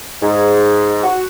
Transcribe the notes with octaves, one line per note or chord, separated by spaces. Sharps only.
G#2
F#4